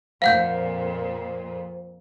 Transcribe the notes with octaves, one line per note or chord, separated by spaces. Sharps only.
F2 A#2 C5 F5 F#5 G6